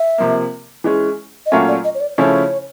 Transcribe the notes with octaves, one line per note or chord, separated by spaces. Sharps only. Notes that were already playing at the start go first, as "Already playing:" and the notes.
Already playing: E5
C3 F3 A#3
E3 G#3 C#4
D#5
A#2 F#3 A3 C#4 F4 E5
D5
D#5
C#5
D5
C#3 F3 A3 C#4 E4 C#5